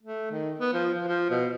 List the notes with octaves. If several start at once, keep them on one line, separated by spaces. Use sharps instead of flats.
A3
D#3
B3
F3
F3
F3
B2